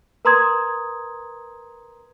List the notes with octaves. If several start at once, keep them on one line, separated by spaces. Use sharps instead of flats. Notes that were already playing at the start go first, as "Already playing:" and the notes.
A#4 B4 A#5 C6 D#6 G#6